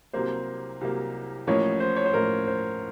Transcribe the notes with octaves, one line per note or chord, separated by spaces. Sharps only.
C2 C3 F#3 A#3 C5
C2 C3 F#3 A#3
A1 A2 F3 A#3 C#4 C#5
C5
C#5
C5
A1 A2 F3 A#3 C#4 A#4
C5